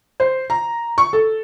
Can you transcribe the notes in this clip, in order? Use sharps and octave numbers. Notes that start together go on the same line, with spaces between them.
C5
A#5
C#6
A4